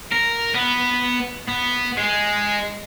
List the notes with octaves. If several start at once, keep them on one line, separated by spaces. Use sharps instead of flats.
A#4
B3
B3
G#3